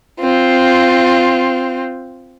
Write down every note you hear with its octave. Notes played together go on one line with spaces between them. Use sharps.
C4 F4